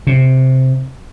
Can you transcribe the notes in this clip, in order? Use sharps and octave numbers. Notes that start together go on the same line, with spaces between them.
C3